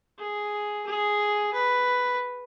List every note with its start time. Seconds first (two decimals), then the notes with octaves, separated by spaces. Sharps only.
0.18 G#4
0.87 G#4
1.53 B4